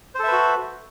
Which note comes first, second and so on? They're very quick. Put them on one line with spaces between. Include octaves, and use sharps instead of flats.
C5 A4 E5 B4 F#4